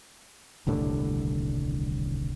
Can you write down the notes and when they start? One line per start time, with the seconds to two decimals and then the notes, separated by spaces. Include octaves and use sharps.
0.66 D#1 C2 A2 D3